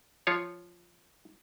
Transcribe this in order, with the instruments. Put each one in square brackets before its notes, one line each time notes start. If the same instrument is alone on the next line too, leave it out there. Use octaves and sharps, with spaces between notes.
[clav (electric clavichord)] F3 F4 C#5